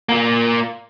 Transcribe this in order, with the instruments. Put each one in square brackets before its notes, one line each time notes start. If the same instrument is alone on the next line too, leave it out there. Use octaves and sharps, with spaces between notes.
[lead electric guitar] A#3 F4